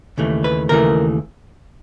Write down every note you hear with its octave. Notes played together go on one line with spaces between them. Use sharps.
D#2 C#3 E3 A3
B4
D#2 C#3 E3 A3 A#4